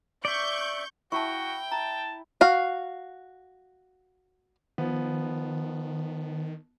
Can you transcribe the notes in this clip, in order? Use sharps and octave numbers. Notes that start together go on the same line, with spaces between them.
D5 E5 C#6 G6
E4 F#4 G5 A5 C#6
A5 A#5
F#4 F5
D#3 F3 B3